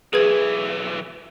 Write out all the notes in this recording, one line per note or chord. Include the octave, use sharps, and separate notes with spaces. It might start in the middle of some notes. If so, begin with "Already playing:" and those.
B1 E3 G#4 B4 G#6